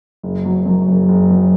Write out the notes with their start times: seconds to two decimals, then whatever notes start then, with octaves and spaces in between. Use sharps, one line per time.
0.23 F#1
0.45 F#3
0.66 F#2
0.88 F#1
1.08 F#1
1.30 F#3